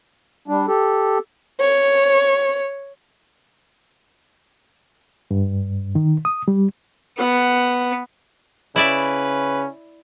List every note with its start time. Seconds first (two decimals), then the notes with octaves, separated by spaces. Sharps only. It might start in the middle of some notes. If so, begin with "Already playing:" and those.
0.48 G3 D4
0.68 G4 A4
1.60 C#5
5.31 G2
5.95 D#3
6.25 D#6
6.48 G3
7.18 B3 F#5
8.76 C#3 C#4 E4 B4 D5 E5